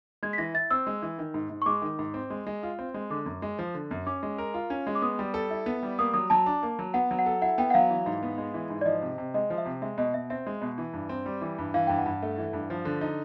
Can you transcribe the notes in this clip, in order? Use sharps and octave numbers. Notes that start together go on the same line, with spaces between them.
G#3 G#6
B6
E3 A#6
E4 A6
C4 E6
G#3
E3
D#3
G#2
G#2
C#6
G#3 D6
D#3
G#2
C4
G#3
G#3
F4
C4
G#3
D3 D6
F#2
G#3
F3
D3
F#2
C#4 D6
G#3
A#4
F4
C#4
G#3
D6
B3 D#6
G3
A4
E4
B3
G3
A#3 D#6
F#3 D#6
F#3 A5
D4
A#3
F#3
B3 F#5
F#3
F#5
A4
E4 F#5
B3 G5
F#5
F#3 F5
E3
G#2
B3
G#3
E3
G#2
D5
F3 D#5
C3
C3
G#3 D#5
F3
E5
C3
G#3 E5
B2 D#5
B2 E5
C4 E5
G#3
B2
E3
G2
C4
G3
E3
G2
E3 F5
G2 G5
F#5
G2
A3
E3
G2
F3
D3
D#4